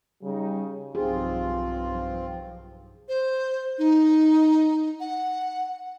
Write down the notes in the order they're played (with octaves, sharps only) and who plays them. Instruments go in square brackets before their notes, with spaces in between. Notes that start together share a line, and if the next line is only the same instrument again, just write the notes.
[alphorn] C#3 [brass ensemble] G3 D#4
[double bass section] B1 G2 F3 [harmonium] C4 F4 [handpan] D#4 G4 G#4
[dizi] C5
D#4
F#5